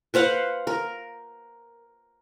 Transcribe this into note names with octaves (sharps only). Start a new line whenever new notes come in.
B4 C5 F5 F#5
A#4